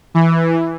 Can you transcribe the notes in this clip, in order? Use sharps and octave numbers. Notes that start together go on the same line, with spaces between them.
E3